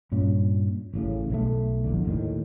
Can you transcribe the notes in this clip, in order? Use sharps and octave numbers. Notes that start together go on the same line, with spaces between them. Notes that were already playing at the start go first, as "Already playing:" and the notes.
G2 A#2 C#4
A1 A2 C#3
B1 E3 A3
A#1 E2 D3
D#2 A2 D#3